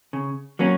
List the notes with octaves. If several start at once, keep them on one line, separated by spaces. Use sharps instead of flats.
C#3
F#3 A#3 C#4